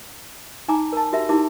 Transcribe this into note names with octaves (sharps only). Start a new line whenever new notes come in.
D#4 G#5 A#5 D6
A#4 A5
F#4 G4 A#4 E5
D#4 E4 G4 A#4 D6